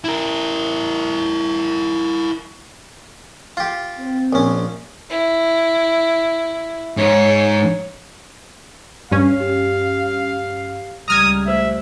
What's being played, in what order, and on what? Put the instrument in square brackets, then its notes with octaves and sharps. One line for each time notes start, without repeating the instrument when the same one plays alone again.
[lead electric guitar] E4 A#4
[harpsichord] F4 G4
[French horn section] C4
[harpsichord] A#1 C#4
[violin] E4
[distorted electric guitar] G#2 [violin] C#5
[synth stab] G2 C#4 [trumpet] F5
[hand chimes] G4
[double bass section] C#2 G3 [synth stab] A#5 F6 G#6 [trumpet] D#6
[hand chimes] A3 C5 B6 [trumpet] E5